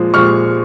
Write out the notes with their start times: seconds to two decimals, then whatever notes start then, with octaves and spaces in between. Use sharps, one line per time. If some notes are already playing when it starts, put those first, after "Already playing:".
Already playing: A#2 F3 G#3
0.14 A#2 F3 G#3 C#6 F6